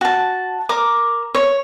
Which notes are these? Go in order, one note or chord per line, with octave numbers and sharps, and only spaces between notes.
F#4 A5
A#4 D6
C#5